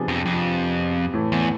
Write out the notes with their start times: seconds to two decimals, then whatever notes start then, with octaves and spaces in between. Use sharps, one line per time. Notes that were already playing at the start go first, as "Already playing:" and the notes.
Already playing: C3 F3 B3 D4 G#4
0.08 F2
0.26 F2
1.13 A2 E3 A3
1.32 E2